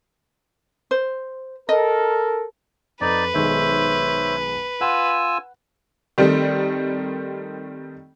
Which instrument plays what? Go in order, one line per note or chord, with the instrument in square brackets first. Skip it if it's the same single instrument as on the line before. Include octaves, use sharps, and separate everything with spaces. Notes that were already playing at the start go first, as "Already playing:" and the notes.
[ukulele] C5
[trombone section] A4 A#4 [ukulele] D#5
[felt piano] F2 [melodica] D#4 D5 [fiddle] B4
[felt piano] B1 D#3 G#3 [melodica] C5 C#5 E5
[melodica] F4 G#5 E6 [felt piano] F#5
[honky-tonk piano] D#3 G3 A3 C4